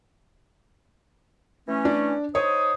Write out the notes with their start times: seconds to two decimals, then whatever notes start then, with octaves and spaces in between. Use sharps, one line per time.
1.68 E3 A3 C#4
1.85 D4
2.35 D#4 C5 C#5 D#6